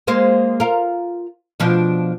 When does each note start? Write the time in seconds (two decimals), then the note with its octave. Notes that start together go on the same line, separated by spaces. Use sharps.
0.07 G#3 A#3 C5
0.60 F4 A#4
1.60 B2 F3 D4